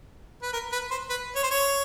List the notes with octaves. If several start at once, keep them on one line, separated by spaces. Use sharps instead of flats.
B4
A#4
B4
C5
B4
C#5
C5
C#5